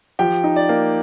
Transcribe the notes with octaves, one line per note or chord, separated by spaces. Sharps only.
F3 G4 G5
D#4
D5
A#3